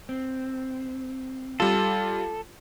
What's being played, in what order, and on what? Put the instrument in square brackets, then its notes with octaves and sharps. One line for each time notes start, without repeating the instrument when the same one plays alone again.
[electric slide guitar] C4
[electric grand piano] G3 F4 [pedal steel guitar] A4